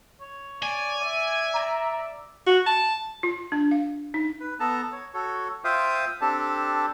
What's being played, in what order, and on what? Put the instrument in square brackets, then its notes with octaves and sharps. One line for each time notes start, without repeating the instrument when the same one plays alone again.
[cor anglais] C#5
[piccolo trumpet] D5 [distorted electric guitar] G#5
[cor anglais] D5 [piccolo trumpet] E5
[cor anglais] D5 [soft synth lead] A#5
[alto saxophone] F#4
A5
[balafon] F4
D4
F5
D#4
[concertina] B4
B3 A4 A5 A#5
C#5
F#4 A4 C#5
F4 C5 E5 F5 G5 D#6
C4 D4 G4 A4 A5